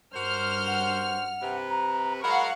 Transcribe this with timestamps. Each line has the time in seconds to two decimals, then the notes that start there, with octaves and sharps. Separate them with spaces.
0.15 G2 F#4 A#4 C5 F6
0.67 F#5
1.42 C3 B4
1.70 A#5
2.23 F#3 G#3 A#4 F5 F#5 B5 C#6